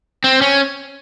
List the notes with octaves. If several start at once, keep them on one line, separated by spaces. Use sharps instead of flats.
C4
C#4